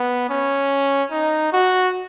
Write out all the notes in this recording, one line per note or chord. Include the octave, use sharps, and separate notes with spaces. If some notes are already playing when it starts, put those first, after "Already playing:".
Already playing: B3
C#4
D#4
F#4